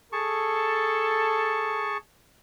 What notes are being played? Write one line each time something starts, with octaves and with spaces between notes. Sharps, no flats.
G#4 A4 A5 C#6